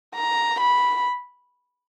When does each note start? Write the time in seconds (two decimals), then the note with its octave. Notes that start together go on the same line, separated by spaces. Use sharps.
0.15 A#5
0.61 B5